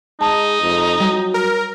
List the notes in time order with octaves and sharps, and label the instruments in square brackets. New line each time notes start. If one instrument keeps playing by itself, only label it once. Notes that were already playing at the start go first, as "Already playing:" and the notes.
[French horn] G#3 [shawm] D#4 [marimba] A5 A#5
[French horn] F2
[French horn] F#3 [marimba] G3
[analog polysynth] A#4